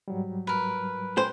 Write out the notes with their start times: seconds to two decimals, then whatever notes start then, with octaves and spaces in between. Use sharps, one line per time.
0.08 G#2 F#3 G3
0.47 A#4 B4
1.17 C5 G5 G#5